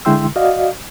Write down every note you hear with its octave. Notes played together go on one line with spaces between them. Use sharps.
D3 G#3 E4 G5 C6 E6
F#4 D5 D#5 F5